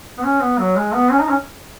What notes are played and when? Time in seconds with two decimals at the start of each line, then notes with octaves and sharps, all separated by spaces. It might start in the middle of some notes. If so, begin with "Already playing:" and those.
0.18 B3
0.23 C#4
0.40 B3
0.58 F#3
0.76 G#3
0.93 B3
1.11 C#4
1.21 D#4
1.29 C#4